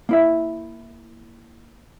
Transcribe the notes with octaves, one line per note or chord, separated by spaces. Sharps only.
A#3 E4 E5